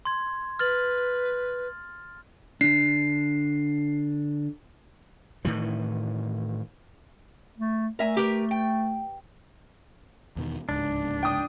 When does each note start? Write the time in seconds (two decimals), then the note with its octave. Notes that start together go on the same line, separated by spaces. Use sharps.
0.05 C6 G#6
0.59 B4 F6 A6 F#7
2.61 D3 D4 C7
5.45 A2 D#3 E3
7.58 A3
7.99 A3 A#4 E5 G#5
8.17 G4 A#4 B4
8.51 G5
10.36 E2 B2 D#3
10.69 D1 C#2 G#2 D4
11.23 G5 D#6